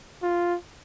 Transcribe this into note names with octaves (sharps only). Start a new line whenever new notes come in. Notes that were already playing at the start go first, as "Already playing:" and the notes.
F4